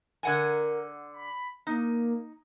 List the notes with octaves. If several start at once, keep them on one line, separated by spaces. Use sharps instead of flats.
D3 A#4 F#5 G#5
B5
A#3 D#4